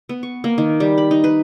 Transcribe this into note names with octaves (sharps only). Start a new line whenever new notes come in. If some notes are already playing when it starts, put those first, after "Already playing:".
B3
C#6
A#3
D#3
G3
B5
D#4
B4